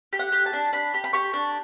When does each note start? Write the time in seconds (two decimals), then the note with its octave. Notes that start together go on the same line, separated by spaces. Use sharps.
0.13 G4
0.19 F#5
0.32 G4
0.46 A5
0.53 D4
0.73 D4 B5
0.94 G4
1.04 B5
1.13 G4 C#6
1.34 D4